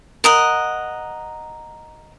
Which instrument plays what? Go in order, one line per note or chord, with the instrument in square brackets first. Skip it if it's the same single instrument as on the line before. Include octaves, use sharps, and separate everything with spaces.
[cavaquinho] A#4 D#5 F#5